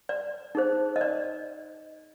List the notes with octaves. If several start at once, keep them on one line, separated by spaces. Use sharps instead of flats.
D5
D#4 G#4 C5
D#5
D5